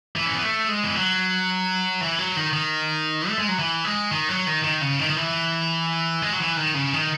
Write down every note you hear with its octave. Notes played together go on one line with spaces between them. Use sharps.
E3
C#4
B3
A3
G#3
E3
F#3
E3
F#3
D#3
D#3
A3
G#3
F#3
E3
G#3
D#3
F#3
D#3
D#3
C#3
D#3
D#3
E3
G#3
F#3
E3
D#3
C#3
D#3